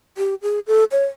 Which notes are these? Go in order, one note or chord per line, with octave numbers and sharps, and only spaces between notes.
G4
G#4
A4
C#5